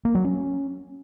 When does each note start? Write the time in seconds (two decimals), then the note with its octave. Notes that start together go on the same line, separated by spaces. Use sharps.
0.05 A#3
0.15 F#3
0.24 C#4